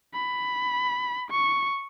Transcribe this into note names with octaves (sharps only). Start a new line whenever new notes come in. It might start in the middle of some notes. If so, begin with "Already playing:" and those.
B5
C#6